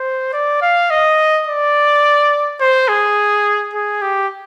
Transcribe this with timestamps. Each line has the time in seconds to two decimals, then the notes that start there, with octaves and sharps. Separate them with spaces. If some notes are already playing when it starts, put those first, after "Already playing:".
Already playing: C5
0.33 D5
0.62 F5
0.90 D#5
1.47 D5
2.61 C5
2.88 G#4
3.73 G#4
4.02 G4